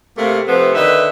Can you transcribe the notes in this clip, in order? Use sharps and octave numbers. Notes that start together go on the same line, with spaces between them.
C3 A3 A#3
C3 F3 A3 B3 C4
D3 D#3 D#4 B4 E5